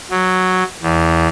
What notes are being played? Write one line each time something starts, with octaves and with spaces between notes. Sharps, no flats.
F#3
E2